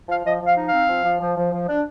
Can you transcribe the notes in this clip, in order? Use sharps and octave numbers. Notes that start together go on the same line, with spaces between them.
F3 F5
F3 D#5
F3 F5
D#4
C4 F5
F3
F3
F3
F3
F3
D4